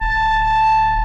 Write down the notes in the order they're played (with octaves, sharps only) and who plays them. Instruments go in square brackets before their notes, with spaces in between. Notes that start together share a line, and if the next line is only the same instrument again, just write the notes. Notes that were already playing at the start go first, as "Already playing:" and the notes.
[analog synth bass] D1 [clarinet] A5